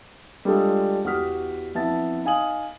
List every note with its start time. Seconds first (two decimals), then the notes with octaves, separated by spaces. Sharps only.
0.45 G3 G#3 D4 F4 G#4 A4
1.04 E2 F#4 G4 D#6 F6 B6
1.75 F2 E3 B3 E5 A5 A6
2.25 D#4 F5 G#5 D#6 F#7